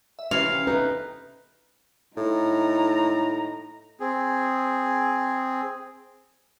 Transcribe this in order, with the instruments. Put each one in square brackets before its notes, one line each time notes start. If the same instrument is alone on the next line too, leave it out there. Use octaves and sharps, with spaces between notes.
[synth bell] E5
[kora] C3 E3 [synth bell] C#4 [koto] F5
[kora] A3 D#4 [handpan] B4
[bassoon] A2 [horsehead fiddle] D#4 A#5
[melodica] C4 G#4